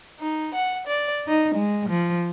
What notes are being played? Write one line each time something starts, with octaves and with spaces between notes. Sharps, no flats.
D#4
F#5
D5
D#4
G#3
F3